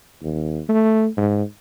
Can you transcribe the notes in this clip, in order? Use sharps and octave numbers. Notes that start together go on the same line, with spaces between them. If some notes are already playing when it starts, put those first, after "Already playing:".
D#2
A3
G#2